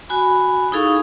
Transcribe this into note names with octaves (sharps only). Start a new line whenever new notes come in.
F#4 G#5 B5
D#4 E4 G#4 A4 F5 C#6